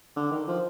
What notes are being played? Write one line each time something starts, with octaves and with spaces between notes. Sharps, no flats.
D3
D#3
F3